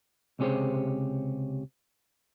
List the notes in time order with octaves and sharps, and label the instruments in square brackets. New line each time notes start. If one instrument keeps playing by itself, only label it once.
[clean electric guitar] C#2 C3 C#4 G4 G#4 C5